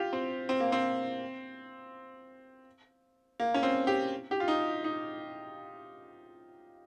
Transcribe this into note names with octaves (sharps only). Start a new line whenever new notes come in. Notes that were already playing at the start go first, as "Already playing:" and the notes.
Already playing: F4 G4
C4
C4
A#3
C4
A#3
C#4
C4
G4
G4
F4
D#4
D#4